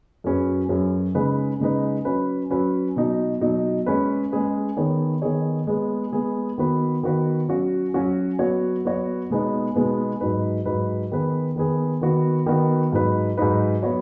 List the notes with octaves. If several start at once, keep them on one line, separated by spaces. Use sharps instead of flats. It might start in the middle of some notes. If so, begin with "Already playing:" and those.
F#2 F#3 C#4 G#4 B4
F#2 F#3 C#4 G#4 B4
C#3 G#3 D#4 B4
C#3 G#3 D#4 B4
F#3 C#4 B4
F#3 C#4 B4
B2 F#3 D#4
B2 F#3 D#4
G#3 C#4 G#4 B4
G#3 C#4 G#4 B4
D#3 B3 D#4 G#4 C#5
D#3 B3 D#4 G#4 C#5
G#3 B3 G#4
G#3 B3 G#4
D#3 B3 F#4 B4
D#3 B3 F#4 B4
F#3 C#4 F#4
F#3 C#4 F#4
F#3 B3 F#4 C#5
F#3 B3 F#4 C#5
B2 G#3 B3 D#4 B4
B2 G#3 B3 D#4 B4
G#2 F#3 D#4 B4
G#2 F#3 D#4 B4
D#3 B3 G#4 B4
D#3 B3 G#4 B4
D#3 B3 F#4
D#3 B3 F#4
G#2 F#3 D#4 B4
G#2 F#3 D#4 B4
F#3 B3 F#4 C#5